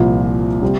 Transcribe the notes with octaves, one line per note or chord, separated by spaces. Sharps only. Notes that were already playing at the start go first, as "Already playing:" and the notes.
Already playing: C2 A#2 F3
C3 G3 C4